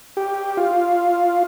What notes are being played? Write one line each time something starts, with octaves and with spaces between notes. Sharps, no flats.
G4
F4